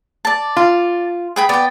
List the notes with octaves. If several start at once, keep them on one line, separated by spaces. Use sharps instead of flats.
D5 A5
F4
G#4 G5 B5
B3 D5 G5